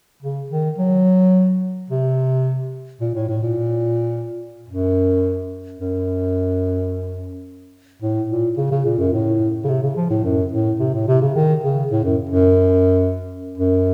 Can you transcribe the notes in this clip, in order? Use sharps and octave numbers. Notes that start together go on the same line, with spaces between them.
C#3
D#3
F#3
C3
A#2
A2
A2
A#2
F#2
F#2
A2
A#2
C#3
C#3
A#2
F#2
A2
C#3
C3
C#3
F3
A2
F#2
A2
C3
A2
C3
C#3
D#3
C#3
A2
F#2
F#2
F#2